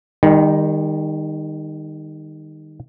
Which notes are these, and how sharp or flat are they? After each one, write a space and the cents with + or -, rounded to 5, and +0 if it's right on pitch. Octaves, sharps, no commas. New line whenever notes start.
D#3 -5 G3 +35